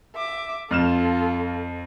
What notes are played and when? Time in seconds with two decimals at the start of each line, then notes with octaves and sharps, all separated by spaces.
0.16 E5 D6
0.71 F2 F4 A4 F6 E7